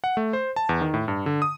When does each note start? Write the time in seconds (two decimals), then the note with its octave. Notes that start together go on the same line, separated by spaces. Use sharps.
0.04 F#5
0.17 A3
0.33 C5
0.56 A5
0.69 E2
0.81 D#3
0.94 A2
1.08 G2
1.26 D3
1.42 D#6